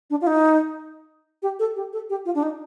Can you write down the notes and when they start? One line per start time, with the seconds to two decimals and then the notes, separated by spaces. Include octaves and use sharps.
0.10 D4
0.21 F4
0.27 D#4
1.42 G4
1.59 A4
1.76 G4
1.93 A4
2.10 G4
2.25 F4
2.35 D4
2.43 D#4